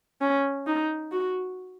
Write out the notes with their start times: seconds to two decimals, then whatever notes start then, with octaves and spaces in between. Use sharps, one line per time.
0.21 C#4
0.66 D#4
1.12 F#4